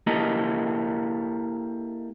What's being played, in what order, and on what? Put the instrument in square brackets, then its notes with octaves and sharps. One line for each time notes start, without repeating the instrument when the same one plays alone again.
[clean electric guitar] A#3 E4 G4 A4 D#5